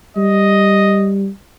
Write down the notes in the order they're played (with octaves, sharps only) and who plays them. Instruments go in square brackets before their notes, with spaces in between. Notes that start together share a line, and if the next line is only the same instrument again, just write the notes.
[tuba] G3 [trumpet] D#5